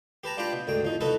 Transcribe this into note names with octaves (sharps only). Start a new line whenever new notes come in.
G4 B4 A5 A#5
D4 F4 G4 D5 G5 B5
B2
D2 G#2 D3 G5
E2 F3 D#4
C2 D#4 F#4 A4 B4 F#5